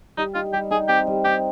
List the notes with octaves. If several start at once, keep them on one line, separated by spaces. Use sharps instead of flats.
G3 D#4
D#4 F4
G3 G4
D#4 G#4
C4 G4
G3
D#4 G4